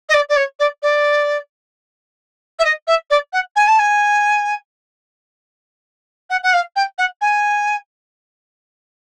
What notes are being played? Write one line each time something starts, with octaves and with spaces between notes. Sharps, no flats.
D#5
D5
D5
C#5
D5
D5
E5
D#5
E5
D5
F#5
G#5
A5
G#5
F#5
F#5
F5
G5
F#5
G#5